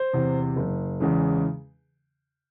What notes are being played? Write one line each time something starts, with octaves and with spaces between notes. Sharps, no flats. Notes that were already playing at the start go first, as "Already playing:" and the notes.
Already playing: C5
E2 C3
F#1
E2 C#3 E3 G#3